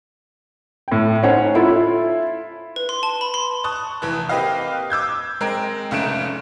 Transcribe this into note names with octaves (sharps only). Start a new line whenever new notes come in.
A2 G5
C#4 D#4 C5 C#5 F#5 G#5
E4 F4 A4
B4
C6
A5
B5
C6
A5 C#6 D#6 F#6
F1 E3 A5 F#6
A#3 C4 G4 B4 D#5 F5
D6 E6 G6 G#6
G#3 C4 A#4 D7
F1 C#3 A3 D7 E7